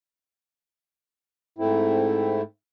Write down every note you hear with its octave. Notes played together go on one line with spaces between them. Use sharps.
G#2 A3 C4 E4